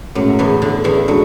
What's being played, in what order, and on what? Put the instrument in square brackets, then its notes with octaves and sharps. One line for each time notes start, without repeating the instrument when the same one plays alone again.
[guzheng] F#2 F#3 [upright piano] A2 G#3 C#4
[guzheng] E2 E3
D3
E2 E3
[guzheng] F#3 [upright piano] G#3 D4 F#4 A4